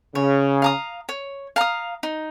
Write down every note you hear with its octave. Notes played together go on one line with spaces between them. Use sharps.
C#3 C#5
F5 A#5 D#6
C#5
F5 A#5 D#6
D#4